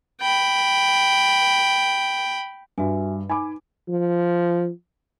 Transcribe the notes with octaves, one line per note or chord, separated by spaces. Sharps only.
G5 B5
G2 F#4 E5 G#5
D#4 G#5 B5 D6
F3